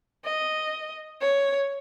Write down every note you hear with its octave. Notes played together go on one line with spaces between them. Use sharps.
D#5
C#5